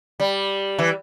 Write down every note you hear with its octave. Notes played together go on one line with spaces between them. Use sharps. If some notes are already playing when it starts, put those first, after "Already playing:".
G3
E3